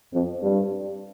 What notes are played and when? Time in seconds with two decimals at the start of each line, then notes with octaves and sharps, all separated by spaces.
0.14 F2
0.43 G2